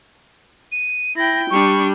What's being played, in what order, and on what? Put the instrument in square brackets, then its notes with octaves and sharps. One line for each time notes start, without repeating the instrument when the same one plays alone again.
[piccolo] D#7
[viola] E4 G5 [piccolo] A#6
[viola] G3 D4 [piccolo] C#6